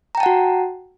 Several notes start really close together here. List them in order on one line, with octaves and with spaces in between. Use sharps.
A#5 G5 A5 F#5 F#4